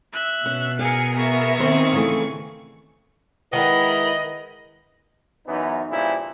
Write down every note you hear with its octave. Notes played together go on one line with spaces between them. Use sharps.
E5 F#6
B2 C#4
G#4 A#4 F5 G#5 C#7
B3 G#4 A#4 E5 C#6
D#3 C4 C#4 C5
C#3 E3 A3
D#3 G#3 E4 A#4 B4 D#5 F#5 B5
F#2 E3 B3 D#4
G2 A#2 C#3 F3 E4